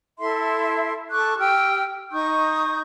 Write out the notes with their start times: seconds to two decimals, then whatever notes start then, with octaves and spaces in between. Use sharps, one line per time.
0.19 E4 A4 E5 C6
1.11 A4 C#6 D6 F#6
1.38 G4 G5 E6 F6
2.11 D#4 C#6 D#6 G6